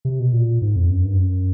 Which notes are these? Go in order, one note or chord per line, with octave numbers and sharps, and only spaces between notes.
C3
B2
A#2
G#2
F2
F#2
G2
F#2